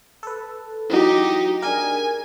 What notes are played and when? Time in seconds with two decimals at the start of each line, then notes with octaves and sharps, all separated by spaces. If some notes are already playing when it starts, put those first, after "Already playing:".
0.23 A4 B4
0.90 E3 F#3 D#4 G4
1.62 D4 G#4 A#4 G#5